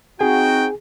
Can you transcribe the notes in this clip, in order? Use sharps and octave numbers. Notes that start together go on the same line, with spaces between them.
C4 D#4 F#4 G#4 G5